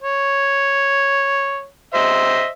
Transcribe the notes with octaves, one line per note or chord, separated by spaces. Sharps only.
C#5
C5 D#5 E5